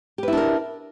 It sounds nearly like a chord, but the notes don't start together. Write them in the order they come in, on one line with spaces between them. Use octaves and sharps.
G4 B4 E4 D4 A#4